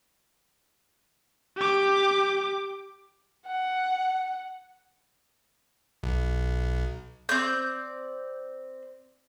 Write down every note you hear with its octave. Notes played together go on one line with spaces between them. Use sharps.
G4 D6
F#5
B1
C4 D5 G6